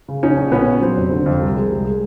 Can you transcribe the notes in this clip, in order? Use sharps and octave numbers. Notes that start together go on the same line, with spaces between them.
C#3
A#1 C#4 D#4
A#1
A#2 B3 C#4
A#2
F#3 C4
F1
D3
F2
C2
G#3
C2
G#3